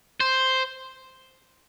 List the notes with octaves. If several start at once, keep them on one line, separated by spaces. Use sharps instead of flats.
C5